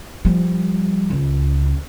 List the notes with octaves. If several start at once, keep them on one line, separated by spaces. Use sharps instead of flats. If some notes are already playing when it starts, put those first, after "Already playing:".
F3 G3
C#2